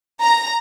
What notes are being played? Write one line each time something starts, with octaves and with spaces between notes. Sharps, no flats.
A#5